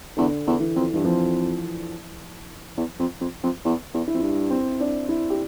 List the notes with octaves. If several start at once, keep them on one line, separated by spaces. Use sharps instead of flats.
E2 D3
E2
E3
F2
G2 E3
F2 F3
E2
F2
F2
F2
E2
E2
E4
F2
G2
C4
D4
E4
G4